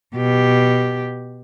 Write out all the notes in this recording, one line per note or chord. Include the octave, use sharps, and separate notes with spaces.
B2 G4